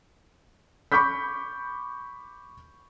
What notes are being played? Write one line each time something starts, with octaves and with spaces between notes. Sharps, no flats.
B5 C#6 D6 G6 B6